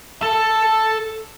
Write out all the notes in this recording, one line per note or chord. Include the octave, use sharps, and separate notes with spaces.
A4 A5